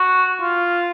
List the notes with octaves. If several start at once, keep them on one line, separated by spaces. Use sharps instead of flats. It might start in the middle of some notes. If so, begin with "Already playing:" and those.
Already playing: F#4
F4